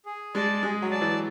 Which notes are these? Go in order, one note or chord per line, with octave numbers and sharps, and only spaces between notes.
G#4
G#3 D5 A5
G#3 G#4
F#3
D5 A5
E3